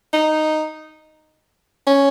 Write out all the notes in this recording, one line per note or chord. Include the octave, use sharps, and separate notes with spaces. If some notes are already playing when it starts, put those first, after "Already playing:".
D#4
C#4